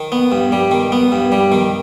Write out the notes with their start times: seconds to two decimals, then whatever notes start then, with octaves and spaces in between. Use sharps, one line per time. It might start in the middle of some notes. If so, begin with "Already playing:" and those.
Already playing: D#3
0.12 B3
0.32 G2
0.52 G3
0.71 D#3
0.92 B3
1.12 G2
1.32 G3
1.52 D#3